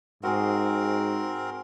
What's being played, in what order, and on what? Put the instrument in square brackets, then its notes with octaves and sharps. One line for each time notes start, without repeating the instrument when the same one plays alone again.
[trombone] G#2 [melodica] C4 A#4 [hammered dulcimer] F#4 G#4